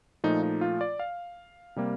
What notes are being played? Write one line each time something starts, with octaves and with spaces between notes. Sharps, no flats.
A#2 F3 A3 D#4
D#4
F4
D5
F5
C3 G3 A#3